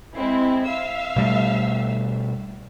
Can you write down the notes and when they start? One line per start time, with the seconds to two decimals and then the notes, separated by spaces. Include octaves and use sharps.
0.14 G#3 C4 E4
0.68 E5 F5 E6
1.16 B2 G3 A3